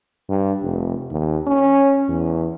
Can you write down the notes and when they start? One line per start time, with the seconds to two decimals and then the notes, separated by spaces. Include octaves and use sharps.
0.29 G2
0.62 F1
1.11 D#2
1.47 C#4
2.09 E2